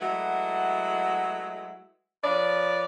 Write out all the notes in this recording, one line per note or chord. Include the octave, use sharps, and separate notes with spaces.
F#3 G#3 A3 E4 B4 F#5
F3 B4 C#5 D5